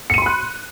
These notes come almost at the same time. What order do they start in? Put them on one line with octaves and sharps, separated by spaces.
C#7 D#7 C6 B5 F#6